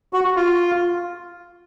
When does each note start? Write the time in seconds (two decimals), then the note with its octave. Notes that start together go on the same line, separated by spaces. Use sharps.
0.13 F#4
0.36 F4